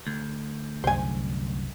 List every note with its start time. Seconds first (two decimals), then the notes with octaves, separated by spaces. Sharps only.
0.07 D2
0.84 C2 F#2 C5 G#5